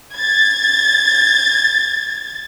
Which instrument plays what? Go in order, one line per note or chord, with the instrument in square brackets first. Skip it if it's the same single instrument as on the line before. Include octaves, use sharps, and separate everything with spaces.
[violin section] G#6 A6